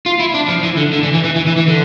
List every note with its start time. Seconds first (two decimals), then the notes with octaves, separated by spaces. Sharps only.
0.06 F4
0.20 E4
0.35 D4
0.49 F3
0.64 E3
0.78 D3
0.93 D3
1.03 E3
1.14 E3
1.25 E3
1.37 E3
1.47 E3
1.58 E3
1.68 D3